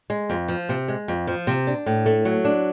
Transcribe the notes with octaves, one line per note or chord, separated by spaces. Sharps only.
G#3
F2
F3
C3
G#3
F2
F3
C3
D4
A2
A3
F#3
D4